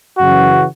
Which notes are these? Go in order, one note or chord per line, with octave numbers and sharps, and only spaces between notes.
F#2 C#3 E3 F#4